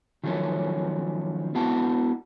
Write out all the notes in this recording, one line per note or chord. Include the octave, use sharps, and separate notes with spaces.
D#3 F3 F#3 A3 C#4
B3 E4 F#4 F5 F#5 A5